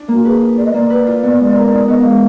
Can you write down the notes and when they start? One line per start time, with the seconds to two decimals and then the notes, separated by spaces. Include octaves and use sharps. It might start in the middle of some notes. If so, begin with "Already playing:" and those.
Already playing: D4
0.08 A#3
0.14 F#4
0.24 G#4 B4
0.41 F4
0.57 D4 D5
0.65 D#5
0.72 A#3 D5
0.90 B4
1.07 F4
1.23 B3
1.40 G#3
1.55 A#4
1.72 D#4
1.88 B3 D#5
2.04 G#3 F5